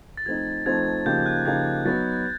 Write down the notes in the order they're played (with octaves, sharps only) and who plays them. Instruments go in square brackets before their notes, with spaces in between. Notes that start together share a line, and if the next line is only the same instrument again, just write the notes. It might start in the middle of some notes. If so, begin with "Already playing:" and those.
[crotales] A6
[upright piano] F3 A3 C4 D#4 [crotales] G#6
[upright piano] F3 A3 C4 D#4 [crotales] G#6
[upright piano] C#3 F3 A#3 D#4 G4 [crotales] G6
[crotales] F#6
[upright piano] C#3 F3 A#3 D#4 G4 [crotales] G#6
[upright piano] F#3 B3 D#4 [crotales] A6